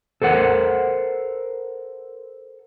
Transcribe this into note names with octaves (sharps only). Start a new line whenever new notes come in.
A4 A#4 C5 F#5